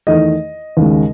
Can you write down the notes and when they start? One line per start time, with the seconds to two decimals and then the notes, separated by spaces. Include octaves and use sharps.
0.07 E2 D#3 A3 D#5
0.77 D#2 C#3 G#3